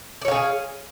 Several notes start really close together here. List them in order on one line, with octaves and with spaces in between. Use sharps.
D5 C#5 F5 G#4